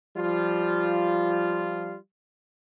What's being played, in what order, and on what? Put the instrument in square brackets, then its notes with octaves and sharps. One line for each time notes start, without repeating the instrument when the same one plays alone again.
[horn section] F3 G3 F4